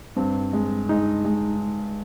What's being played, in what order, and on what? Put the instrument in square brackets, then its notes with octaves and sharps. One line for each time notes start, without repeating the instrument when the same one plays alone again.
[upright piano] G2 [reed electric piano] C4
[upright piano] G#3
[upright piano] G#3 [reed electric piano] D#4
[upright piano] G#3